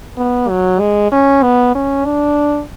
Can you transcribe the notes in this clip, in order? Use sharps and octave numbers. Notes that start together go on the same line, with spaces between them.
B3
F#3
G#3
C#4
B3
C#4
D4